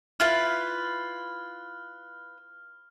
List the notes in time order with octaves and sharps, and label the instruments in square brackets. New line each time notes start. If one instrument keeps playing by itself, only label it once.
[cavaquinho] E4 F4 B4 [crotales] F6